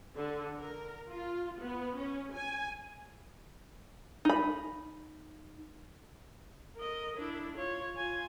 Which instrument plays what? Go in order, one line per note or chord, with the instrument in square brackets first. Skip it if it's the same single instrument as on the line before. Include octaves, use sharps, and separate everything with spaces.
[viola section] D3
A#4
F4
B3
C#4
G#5
[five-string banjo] D#4 B5
[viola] A#4 D#5
D4 E4
F4 C#5
F4 G#5